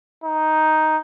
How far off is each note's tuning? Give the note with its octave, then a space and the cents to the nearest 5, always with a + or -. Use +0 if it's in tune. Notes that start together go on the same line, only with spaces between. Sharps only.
D#4 +5